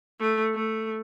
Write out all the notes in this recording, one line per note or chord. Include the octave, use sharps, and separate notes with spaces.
A3
A3